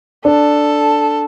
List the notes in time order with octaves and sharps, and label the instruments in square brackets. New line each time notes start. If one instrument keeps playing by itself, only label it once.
[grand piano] D4 [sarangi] A4